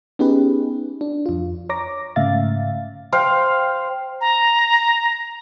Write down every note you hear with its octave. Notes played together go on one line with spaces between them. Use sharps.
B3 C#4 D#4 G4 G#4 B4
D4
F2 F4
C#5 A#5 D6 A#6
G#2 C#3 A3 E5 F5 A6
C5 F5 G5
A#5